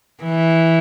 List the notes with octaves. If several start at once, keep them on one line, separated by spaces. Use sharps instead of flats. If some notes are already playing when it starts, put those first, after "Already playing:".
E3